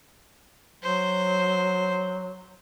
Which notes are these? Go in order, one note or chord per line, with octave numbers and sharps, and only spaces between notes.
F#3 C5